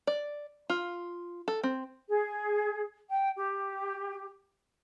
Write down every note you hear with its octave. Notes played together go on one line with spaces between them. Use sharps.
D5
F4
A4
C4
G#4
G5
G4